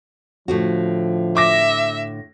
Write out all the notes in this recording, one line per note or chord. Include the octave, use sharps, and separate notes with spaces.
A2 D3 F3 F#4
E5 D6 A#6